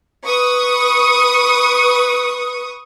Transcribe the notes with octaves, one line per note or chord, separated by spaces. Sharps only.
B4 C#6 D#6